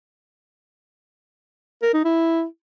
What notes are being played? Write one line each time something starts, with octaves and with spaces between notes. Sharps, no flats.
A#4
D#4
E4